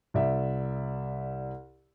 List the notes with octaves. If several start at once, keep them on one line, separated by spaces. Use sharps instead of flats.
C2 D5 E5